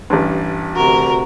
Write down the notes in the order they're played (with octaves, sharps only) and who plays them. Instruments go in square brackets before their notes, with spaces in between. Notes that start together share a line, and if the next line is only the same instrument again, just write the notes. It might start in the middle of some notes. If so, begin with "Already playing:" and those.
[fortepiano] A1 G2
[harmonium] D2 C3 F#4 [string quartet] A#4